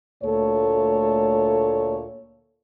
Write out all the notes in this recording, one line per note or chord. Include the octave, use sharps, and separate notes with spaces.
D2 A#2 A3 A4 C#5